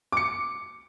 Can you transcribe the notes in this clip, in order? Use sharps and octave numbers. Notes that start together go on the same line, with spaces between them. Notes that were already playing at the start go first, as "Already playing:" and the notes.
D6 C#7